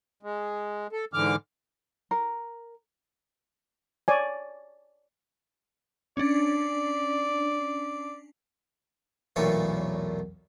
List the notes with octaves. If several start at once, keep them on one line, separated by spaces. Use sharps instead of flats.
G#3
A4
G#2 D3 E3 D6 F6
A#4
C#5 D5 G#5
C#4 D4 D5
B1 E2 A#2 A3 A#3 C#5